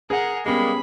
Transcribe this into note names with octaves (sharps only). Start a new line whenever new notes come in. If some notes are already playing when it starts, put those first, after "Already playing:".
G#4 A#4 F#5
G3 G#3 A#3 B3 C#4 G4 B5